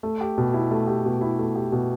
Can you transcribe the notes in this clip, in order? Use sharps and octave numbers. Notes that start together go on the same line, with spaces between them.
A3
G4
B2
E4
A3
G4
B2
E4
A3
G4
B2